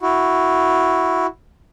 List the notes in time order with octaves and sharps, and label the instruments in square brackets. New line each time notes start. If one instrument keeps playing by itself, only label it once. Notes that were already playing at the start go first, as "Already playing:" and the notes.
[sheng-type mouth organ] E4 F#4